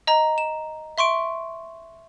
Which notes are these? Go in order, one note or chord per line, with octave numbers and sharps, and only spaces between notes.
D#5 A#5
E7
E5 C6 C#6 D7